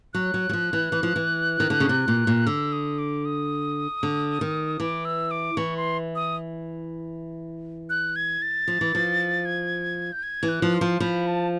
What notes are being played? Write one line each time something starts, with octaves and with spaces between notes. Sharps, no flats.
F#3 F#6
F#3
F#3
F3
E3
E3
F3
E3
D#3
D3
C#3
C3
A#2
A#2
D3 E6
D#6
D6
D#6
D3
D#3
E3 D6
E6
D6
E3 C#6
C6
D#6
F#6
G#6
A6
F3
E3
F3
G#6
G6
G#6
E3
F#6
F3
C6
F3
F3 B5
A5